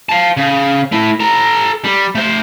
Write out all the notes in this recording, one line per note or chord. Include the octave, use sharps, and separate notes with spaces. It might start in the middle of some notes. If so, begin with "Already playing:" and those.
F5 A5
C#3
A3 E4
A4 A#5
G3
A3 C5